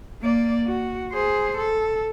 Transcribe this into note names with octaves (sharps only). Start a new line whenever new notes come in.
A#3 D5
F#4
G#4 C5
A4